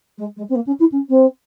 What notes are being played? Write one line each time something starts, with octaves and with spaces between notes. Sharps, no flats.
G#3
G#3
C4
A#3
C#4
E4
C#4
C4